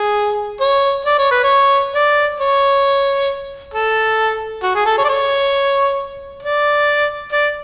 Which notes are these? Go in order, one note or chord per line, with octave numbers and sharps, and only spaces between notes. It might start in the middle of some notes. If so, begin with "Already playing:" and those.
Already playing: G#4
C#5
D5
C#5
B4
C#5
D5
C#5
A4
F#4
G#4
A4
C#5
D5
C#5
D5
D5